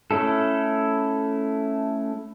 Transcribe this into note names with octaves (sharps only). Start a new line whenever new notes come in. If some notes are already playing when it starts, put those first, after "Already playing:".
A3 C#4 E4 A4